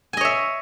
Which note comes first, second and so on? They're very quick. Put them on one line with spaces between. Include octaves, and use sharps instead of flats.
G#5 D#5 C#5 E5